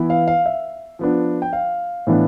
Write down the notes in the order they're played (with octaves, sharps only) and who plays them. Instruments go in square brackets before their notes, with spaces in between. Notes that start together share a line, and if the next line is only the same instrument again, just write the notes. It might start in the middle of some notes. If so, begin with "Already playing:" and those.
Already playing: [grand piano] E3 B3 E4
F5
F5
E5
F3 B3 D4
G5
F5
A2 E3 B3 D4